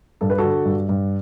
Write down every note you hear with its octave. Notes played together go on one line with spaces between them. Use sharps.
G2 A4
B4
F#4 A4
D3
G2
G2